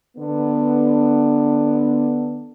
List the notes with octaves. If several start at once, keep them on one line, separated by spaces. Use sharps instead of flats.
D3 B3